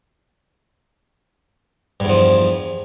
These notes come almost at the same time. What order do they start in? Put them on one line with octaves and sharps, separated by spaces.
G2 E2 F3